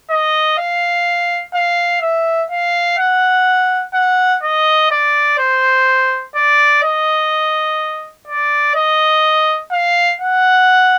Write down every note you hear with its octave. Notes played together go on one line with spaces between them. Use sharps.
D#5
F5
F5
E5
F5
F#5
F#5
D#5
D5
C5
D5
D#5
D5
D#5
F5
F#5